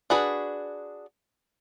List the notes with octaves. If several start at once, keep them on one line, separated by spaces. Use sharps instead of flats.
D4 F#4 G#4 B4